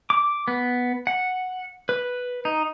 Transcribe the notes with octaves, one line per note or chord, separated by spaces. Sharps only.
D6
B3
F#5
B4
D#4